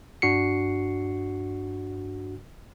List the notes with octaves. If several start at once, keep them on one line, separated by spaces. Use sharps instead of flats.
G2 D4 F#4 C7 C#7